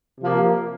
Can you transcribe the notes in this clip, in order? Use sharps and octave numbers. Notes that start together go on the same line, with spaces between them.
C3 F3 A#3